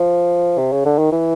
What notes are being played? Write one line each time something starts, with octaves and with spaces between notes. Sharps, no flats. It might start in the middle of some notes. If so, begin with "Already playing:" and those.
Already playing: F3
C3
C#3
D3
D#3
E3